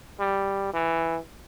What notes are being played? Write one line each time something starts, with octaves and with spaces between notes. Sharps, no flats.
G3
E3